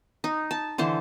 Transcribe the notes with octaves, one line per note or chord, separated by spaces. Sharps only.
D#4
A5
D3 E3 C5 A5